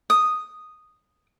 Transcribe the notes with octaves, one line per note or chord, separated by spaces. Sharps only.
D#6